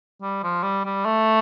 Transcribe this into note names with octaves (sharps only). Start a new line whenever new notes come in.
G3
F3
G3
G3
A3